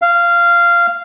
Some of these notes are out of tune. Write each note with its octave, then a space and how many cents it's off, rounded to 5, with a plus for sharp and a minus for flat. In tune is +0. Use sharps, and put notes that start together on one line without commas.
F5 -15